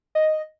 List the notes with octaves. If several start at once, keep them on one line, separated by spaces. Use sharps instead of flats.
D#5